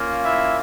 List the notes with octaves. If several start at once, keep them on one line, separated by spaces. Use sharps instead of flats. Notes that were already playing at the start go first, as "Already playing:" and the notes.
Already playing: A#3 C#4 F4
E4 E5